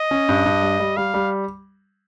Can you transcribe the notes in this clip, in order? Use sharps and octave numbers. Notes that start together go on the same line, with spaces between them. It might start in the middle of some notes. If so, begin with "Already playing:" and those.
Already playing: D#5
C#4
G2
G2
G3
G3
G3 F5
G3